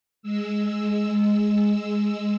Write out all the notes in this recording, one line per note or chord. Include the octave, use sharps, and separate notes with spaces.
G#3 E6